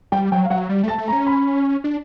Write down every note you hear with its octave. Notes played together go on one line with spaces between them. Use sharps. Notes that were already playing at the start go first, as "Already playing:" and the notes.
G3 G5
F#3 G5
F5
F#3 F#5
G3
A3 A5
A3
A#5
C#4
B5
D4